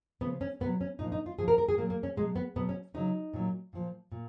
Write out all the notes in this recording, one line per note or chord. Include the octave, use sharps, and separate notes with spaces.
C#3 F3 B3
C#4
B2 F#3 B3
C#4
A#2 F3 D#4
D#4
F4
A#2 F3 G#4
A#4
A#4
G#4
A#2 F#3 A#3
A#3
C#4
B2 F#3 G#3
B3
B2 F#3 B3
C#4
C#3 F#3 D#4
A#2 F#3
A#2 F3
A#2